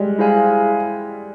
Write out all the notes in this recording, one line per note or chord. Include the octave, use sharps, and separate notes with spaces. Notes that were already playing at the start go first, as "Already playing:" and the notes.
Already playing: G3 G#3
E4 G#4 C5 F5 G#5